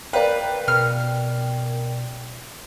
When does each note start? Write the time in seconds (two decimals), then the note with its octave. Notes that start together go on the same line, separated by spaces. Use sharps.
0.13 A#4 B4 D5 F5 G5
0.68 B2 F6